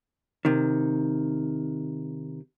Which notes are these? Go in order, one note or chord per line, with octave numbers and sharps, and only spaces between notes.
C3 D#3